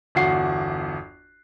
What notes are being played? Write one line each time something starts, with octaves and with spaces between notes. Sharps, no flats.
G1 E2 F#4 C7